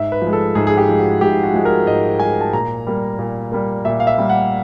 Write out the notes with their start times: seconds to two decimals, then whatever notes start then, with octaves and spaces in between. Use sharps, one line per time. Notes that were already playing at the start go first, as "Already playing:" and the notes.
Already playing: G#2 E5
0.12 B4
0.22 F3
0.27 G#3
0.33 A4
0.55 G#2 G#4
0.67 G#4
0.77 G4
0.88 F3 G#3
0.99 F#4
1.21 G#2 G4
1.43 F#4
1.54 F3 G#3
1.65 A#4
1.87 G#2 D#5
2.20 F3 G#3 G#5
2.41 A5
2.53 A#2 A#5
2.87 G3 A#3
3.19 A#2
3.52 G3 A#3
3.85 A#2 E5
4.00 F5
4.07 E5
4.18 G3 A#3
4.30 F#5